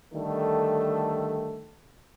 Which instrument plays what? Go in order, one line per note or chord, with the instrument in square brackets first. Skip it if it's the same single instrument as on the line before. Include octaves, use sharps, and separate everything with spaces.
[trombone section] D3 D#3 G3 A3 A4